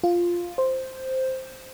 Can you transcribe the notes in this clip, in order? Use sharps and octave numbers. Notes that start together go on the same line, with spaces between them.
F4
C5